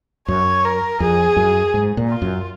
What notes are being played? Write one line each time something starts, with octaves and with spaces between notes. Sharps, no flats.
F#2 C#5
A#4
F2 G#4
F#2
G#2
A#2
F4
F#2